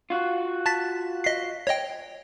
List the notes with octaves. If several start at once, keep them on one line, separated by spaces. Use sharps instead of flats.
F4 F#4
A5 A6 B6
D#5 B6 C7
C#5 D#5 G5